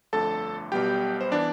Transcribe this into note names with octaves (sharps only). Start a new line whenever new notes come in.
G1 F2 D3 A3 A4 A5
B1 B2 G3 B3 G4 G5
C5
E3 B3 D4 D5